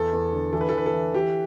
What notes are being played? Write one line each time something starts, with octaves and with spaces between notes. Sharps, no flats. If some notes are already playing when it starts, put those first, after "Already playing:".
Already playing: E2 A4
E2
D3
E3 A4
B4
A4
E3 B4
A4
E3
E3 G4